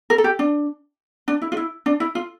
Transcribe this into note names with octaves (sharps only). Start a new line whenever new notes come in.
A#4
A4
G4
D4
D4
E4
F4
E4
D4
E4
F4